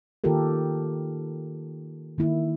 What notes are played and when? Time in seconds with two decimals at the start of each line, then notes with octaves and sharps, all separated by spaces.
0.24 D#3 A#3 F4 G4 A4 A#4
2.18 D#3 A#3 E4